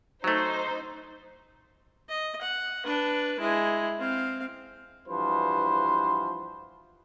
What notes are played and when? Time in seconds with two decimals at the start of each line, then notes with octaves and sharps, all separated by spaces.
0.24 F#3 A3 D#4 C5
2.08 D#5
2.41 F#5
2.85 D4 B4
3.40 G#3 E4
3.99 C4 F5
5.09 G2 E3 F3 F#4 B4 C5